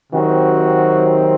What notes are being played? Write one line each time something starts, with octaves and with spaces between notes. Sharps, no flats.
C3 D#3 F#3 C4 F#4